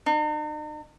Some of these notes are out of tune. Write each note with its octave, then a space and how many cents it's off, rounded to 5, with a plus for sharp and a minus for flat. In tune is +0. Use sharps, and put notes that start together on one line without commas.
D#4 -45